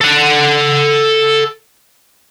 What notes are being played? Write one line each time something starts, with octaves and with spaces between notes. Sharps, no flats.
A4 F#5